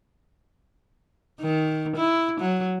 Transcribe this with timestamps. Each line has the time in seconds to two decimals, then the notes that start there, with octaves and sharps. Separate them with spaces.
1.40 D#3
1.97 E4
2.41 F#3